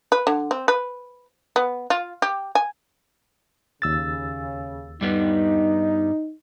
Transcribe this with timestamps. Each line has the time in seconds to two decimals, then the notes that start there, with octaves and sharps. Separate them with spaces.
0.12 B4
0.27 D3
0.51 C4
0.68 B4
1.56 B3
1.90 F4
2.22 G4
2.55 G#5
3.82 D#2 C#3 E6 A6
5.01 G2 G3 B3 D#4